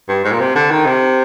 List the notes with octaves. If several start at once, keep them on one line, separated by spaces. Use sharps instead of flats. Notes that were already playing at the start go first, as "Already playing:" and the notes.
G2
G#2
A#2
C3
D3
D#3
C3